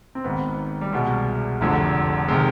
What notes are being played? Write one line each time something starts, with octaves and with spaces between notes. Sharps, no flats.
C4
G#1 G#2 D#3 B3
G3
C2 B2 G#3
F1 F2 D3
C3 D#3 G#3